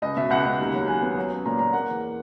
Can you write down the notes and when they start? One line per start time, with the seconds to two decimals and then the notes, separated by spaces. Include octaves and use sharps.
0.02 C#2 D#5
0.17 B2 E5
0.30 C#2 F#5
0.45 C#2
0.60 D#2
0.74 F#3
0.88 F#3 G#5
1.02 B3
1.17 F#3
1.31 C#4
1.46 A#2 A#5
1.59 A#2 A#5
1.73 A#3 F#5
1.89 E2